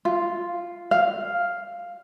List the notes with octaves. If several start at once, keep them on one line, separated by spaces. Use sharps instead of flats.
F4
F5